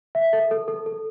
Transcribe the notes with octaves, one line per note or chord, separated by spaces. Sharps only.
E5
A4
A4
A4
A4